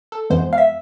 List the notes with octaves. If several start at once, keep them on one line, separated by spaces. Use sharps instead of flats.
A4
F2 E3 G#3 B3 C5
F5
E5